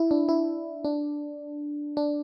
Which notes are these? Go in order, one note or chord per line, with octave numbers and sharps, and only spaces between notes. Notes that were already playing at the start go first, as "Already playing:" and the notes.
Already playing: E4
D4
E4
D4
D4